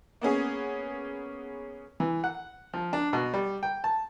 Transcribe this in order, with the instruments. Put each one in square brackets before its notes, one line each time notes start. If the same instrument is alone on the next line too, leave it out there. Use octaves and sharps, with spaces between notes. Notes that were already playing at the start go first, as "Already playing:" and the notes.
[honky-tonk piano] A#3 B3 C#4 G#4
[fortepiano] E3
F#5
F3
D4
B2
G3
G5
A5